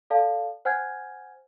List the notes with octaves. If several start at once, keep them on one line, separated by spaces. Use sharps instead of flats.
A4 D5 F5 A5
C5 F#5 G#5 F6 G6 G#6